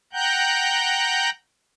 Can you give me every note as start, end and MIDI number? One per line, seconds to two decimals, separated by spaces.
0.13 1.30 78
0.13 1.30 79
0.13 1.30 82
0.13 1.30 90
0.13 1.30 91